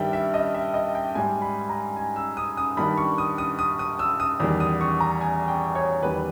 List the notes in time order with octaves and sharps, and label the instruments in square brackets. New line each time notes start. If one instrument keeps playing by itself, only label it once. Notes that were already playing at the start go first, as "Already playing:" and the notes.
Already playing: [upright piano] G2 D#3 G3 E5 G5
E5
D#5
E5
D#5
G5
G#2 G3 G#5
B5
A#5
G#5
E6
D#6
D#6
G2 D#3 G3 B5
C#6
D#6
D#6
D#6
D#6
E6
D#6
E2 D#3 G3
D#6
C#6
A#5
G#5
G5
C#5
E2 D#3 G3 B4